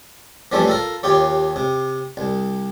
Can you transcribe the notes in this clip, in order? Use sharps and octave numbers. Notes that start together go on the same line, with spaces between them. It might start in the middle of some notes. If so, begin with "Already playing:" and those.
E3 F3 G3 A3 C4 C#4
F4 A4 A#4
D#2 F4 G4 C#5
C3
C2